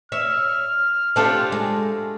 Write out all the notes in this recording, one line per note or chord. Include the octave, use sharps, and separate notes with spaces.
C#5 E5 F6
A3 D4 F4 G4 C5
G#3